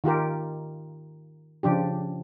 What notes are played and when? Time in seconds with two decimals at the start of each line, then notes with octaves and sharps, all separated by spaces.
0.04 D#3 F4 G4 A#4
1.63 C#3 F3 D4 G4